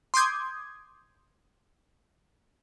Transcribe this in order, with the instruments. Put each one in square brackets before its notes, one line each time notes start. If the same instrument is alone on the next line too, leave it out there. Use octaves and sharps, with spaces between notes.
[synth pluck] C6 D6 D#6 G6 G#6